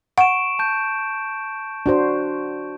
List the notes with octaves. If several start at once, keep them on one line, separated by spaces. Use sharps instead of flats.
F#5 C#6 D7 E7
A5 G6
D4 F#4 C5